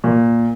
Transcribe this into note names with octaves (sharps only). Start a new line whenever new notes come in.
A#2